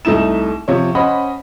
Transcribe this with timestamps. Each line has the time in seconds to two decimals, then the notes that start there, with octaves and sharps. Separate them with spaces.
0.05 C2 A3 D#4 E4 E7
0.68 C3 F3 C#5
0.95 C#4 C5 D#5 F#5 B5